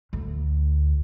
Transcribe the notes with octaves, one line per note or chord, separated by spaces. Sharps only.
D2